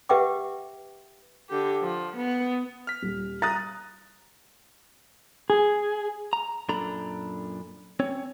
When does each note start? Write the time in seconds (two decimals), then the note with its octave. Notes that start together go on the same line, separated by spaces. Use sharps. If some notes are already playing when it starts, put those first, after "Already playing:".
0.09 G4 B4 E5 F#5 G5 D6
1.49 D3 G4
1.83 F3
2.16 B3
2.87 F6 B6
3.02 D#1
3.42 A#5 D#6 F#6 A6
5.50 G#4
6.33 A#5
6.69 F#2 A#2 D4 A4 A#5 B5
8.00 C4 C#4 C#5